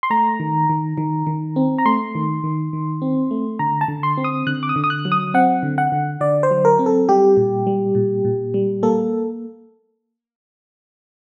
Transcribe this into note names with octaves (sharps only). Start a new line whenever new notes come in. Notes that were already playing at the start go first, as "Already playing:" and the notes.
C6
A3 A#5
D#3
D#3
D#3
D#3
C4
A#5
A3 C6
D#3
D#3
D#3
C4
A3
D3 A#5
A5
D3
C6
C4
D#6
D3 F#6
D6
D#6
D3
D#6
F#6
F#3
D#6
C4 F#5
D3
F#5
D3
D3 D5
C5
F#3
A#4
C4
A4
G3 G4
A#2
G3
A#2
A#2
G3
A#3 A4